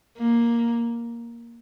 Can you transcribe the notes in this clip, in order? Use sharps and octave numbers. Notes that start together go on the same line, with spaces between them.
A#3